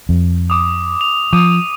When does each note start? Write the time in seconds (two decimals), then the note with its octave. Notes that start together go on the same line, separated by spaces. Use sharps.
0.09 F2
0.50 D6 D#6
1.01 F7
1.33 F3 D6 D#6 D#7